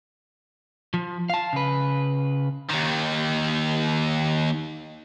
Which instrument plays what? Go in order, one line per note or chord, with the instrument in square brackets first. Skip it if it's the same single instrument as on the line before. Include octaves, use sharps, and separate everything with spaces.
[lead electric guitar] F3
F5 A5
C#3 B4
[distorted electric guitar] D#2 D#3